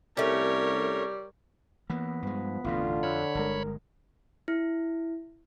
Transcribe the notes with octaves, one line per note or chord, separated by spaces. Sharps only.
C2 G3 A3 C#4 A#4 C#5
E3 A#3 B3
G2 F3 G#3
A1 F2 B2 D3 F4
F2 C#5 B5
G1 C3 G#3 A#4
E4